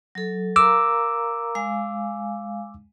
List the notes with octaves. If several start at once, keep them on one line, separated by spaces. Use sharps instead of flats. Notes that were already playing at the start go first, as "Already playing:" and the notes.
F#3 A4
A#4 F5 A#5 D6 E6
G#3 F5 G#5